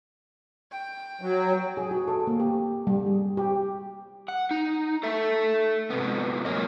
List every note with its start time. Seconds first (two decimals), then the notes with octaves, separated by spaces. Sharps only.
0.72 G5
1.21 F#3
1.77 G#4
1.91 F#4
2.08 A4
2.27 A#3
2.40 G4
2.87 G3
3.06 G#4
3.37 G4
4.28 F#5
4.51 D#4
5.03 A4 E5
5.90 G#2 C3 B3
6.45 F2 A#2 F#3 A#4 C#5 D#5